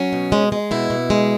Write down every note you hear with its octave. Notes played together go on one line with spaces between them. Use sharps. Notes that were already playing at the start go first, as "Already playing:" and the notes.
Already playing: F#3 C#4
B2
G#3
G#3
B2 E4
B2
G#3